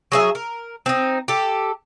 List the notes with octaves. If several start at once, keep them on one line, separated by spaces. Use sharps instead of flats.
F#3 G#4 E5
A#4
C4 D#4
G4 A4